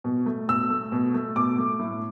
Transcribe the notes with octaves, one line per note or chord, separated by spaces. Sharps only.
B2
A3
B2 E6
A3
B2
A3
B2 D6
A3
A2